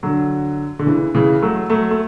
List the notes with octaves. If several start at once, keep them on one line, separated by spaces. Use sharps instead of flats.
D3 F#3
D3
C#3 E3
C#3 E3
F#3 A3
F#3 A3
A3